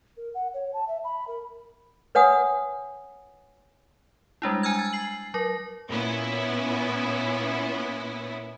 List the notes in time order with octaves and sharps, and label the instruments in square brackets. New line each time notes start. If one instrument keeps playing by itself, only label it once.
[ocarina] A#4
F#5
C#5
A5
E5
B5
A#4
[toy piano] B4 C#5 F#5 G#5 D#6
[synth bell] G3 G#3 D4 E4
G#5 A#5 E6 F6 G#6
A6
C7 F#7
F#3 A#4 A#6
[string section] A#2 B3 C#4 E4